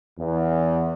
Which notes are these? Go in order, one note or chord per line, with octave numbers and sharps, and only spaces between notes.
E2